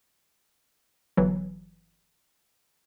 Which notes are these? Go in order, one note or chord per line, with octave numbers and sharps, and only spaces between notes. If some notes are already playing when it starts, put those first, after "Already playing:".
G1 E3 F#3